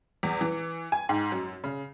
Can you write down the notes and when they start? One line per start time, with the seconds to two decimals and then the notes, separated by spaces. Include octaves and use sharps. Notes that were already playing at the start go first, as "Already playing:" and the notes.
0.23 E2
0.41 E3
0.92 G#5
1.09 G#2
1.32 F#2
1.64 C#3